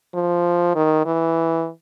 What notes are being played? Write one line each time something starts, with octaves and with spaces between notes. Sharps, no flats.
F3
D#3
E3